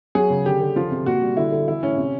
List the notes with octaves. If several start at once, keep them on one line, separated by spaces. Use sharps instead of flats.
F#3 G#4
C#3
D3 G4
D3
F3 F4
C3
A#2 F#4
G3
D3 E4
D3
E3 E4
A2 C#4
C3